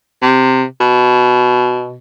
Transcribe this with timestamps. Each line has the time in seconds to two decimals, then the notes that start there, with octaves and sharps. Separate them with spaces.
0.22 C3
0.81 B2